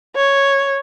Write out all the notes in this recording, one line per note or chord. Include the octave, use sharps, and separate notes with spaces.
C#5